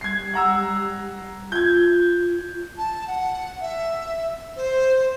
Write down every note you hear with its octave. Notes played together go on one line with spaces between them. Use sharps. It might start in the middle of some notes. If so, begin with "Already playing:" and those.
G3 G#6 C7
F#5 A#5 E6
F4 G6 G#6
A5
F#5
E5
C5